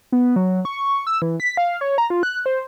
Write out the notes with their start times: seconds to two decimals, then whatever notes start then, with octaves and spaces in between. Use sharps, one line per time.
0.12 B3
0.36 F#3
0.65 C#6
1.07 E6
1.22 E3
1.40 B6
1.57 F5
1.81 C#5
1.98 A#5
2.10 F4
2.23 F#6
2.46 C5